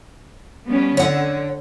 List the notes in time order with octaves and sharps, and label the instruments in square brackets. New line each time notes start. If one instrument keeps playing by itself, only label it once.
[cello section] G3 B3 C#4
[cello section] D3 [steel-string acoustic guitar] C#5 F#5